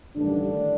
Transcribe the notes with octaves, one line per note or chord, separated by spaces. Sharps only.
A1 G2 D3 D#3 G3 D4